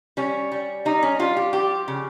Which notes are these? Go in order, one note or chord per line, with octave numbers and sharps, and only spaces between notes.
G3 C#4
G3
G3 D#4
C#4
G3 F4
G4
F3 G4
C#3